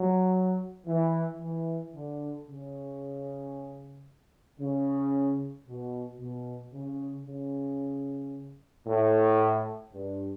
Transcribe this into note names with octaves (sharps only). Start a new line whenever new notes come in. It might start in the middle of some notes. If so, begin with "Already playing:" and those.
Already playing: F#3
E3
E3
D3
C#3
C#3
B2
B2
C#3
C#3
A2
G2